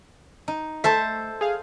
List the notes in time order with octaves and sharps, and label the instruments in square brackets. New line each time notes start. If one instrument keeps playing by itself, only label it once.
[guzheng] D#4
[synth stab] A3 [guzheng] A4 C5 E5
[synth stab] G#4 F5